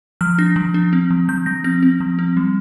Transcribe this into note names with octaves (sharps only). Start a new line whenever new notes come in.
F3 F6
D4 A#6
F3
D4
C4
F3
F3 G6
F3 A#6
C4 A#6
C4
F3
C4
G3